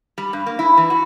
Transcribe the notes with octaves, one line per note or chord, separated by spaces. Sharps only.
G3
G2
A#3
E4
E3
F#4